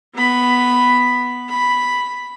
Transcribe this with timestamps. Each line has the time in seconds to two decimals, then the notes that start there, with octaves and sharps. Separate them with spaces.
0.15 B3 B5
1.49 B5